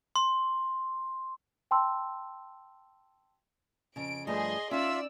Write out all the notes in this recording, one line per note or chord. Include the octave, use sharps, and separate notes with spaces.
C6
G5 A5 C6 E6
F2 C#3 D7
G2 F3 A3 G#4 D#5 C6
C#4 D#4 F4 D5 E5 E6